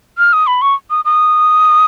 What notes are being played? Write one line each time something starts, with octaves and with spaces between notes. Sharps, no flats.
F6
D#6
B5
C#6
D#6
D#6